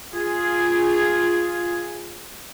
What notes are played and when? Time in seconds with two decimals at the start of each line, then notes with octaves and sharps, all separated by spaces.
0.12 F4 G#4